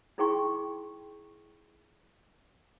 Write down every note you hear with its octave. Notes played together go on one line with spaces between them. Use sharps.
D#4 E4 G#4 G5 C6 C#6